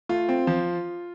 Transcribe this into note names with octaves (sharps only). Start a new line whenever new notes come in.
A3 F4
C4
F3